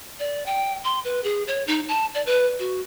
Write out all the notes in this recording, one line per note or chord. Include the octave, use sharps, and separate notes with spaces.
D5
G5
C6
B4
G#4
C#5
D#4
A5
D5
B4
F#4